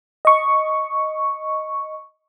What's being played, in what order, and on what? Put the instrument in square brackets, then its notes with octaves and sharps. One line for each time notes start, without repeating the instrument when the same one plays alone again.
[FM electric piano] D#5 C#6